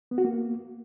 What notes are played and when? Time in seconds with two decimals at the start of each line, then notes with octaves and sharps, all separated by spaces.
0.11 B3
0.18 F#4
0.24 A#3